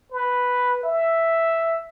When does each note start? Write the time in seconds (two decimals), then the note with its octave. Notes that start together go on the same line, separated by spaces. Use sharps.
0.12 B4
0.83 E5